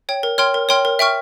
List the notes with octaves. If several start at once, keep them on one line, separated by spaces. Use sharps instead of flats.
C#5 G5
A#4
C#5 G5 C6 F6
A#4
C#5 G5 C6 F6
A#4
E5 G5 C#6 F6